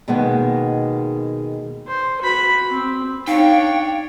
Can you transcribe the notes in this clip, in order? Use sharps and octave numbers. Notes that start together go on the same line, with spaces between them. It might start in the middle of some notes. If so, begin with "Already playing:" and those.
B2 D#3 G#3 A#3 B3
C5
F#4 B5
C4
D4 D#4 C#5 F5 G5